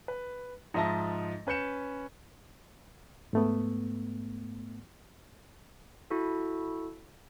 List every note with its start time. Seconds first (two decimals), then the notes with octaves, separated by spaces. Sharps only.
0.08 B4
0.74 G#2 F3 D#5 E5 A5 A#6
1.47 C#4 B4 G6 C#7 E7
3.33 G#2 A3 B3
6.10 E4 F#4 A4